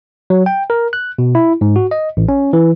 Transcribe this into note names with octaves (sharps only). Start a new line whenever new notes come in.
F#3
G5
A#4
F#6
B2
E4
G#2
F#4
D#5
A1
C#4
E3